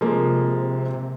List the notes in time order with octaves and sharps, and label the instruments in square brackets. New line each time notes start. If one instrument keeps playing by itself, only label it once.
[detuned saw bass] C3 [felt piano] F3 G#3 A#3